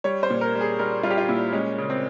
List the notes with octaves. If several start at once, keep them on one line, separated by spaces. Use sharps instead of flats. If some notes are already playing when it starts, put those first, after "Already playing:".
G3 C#5
C5
A#2
A#4
G3
G#4
G3 A#4
G3 F4
G4
F4
A#2 E4
G#3 C#4
C#3
C4